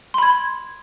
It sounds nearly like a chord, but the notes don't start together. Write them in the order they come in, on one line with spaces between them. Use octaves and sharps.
C6 B5 G#6